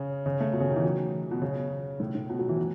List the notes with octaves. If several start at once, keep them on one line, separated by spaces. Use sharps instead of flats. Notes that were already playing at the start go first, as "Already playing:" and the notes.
Already playing: C#3
C#3
A3
B2
C#3
D#3
E3
F#3
B2
C#3
A2
A2
B2
F#3
E3
F#3